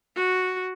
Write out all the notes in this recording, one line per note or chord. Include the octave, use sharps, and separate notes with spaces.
F#4